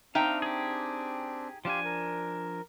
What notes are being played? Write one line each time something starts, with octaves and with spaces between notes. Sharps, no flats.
C4 D4 D#4 E5 F5 G5
G4 G#4
F3 D4 G4 F5 G#5 C6
A#4